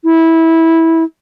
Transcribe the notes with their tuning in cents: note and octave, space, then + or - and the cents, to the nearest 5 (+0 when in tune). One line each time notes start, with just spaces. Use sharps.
E4 -15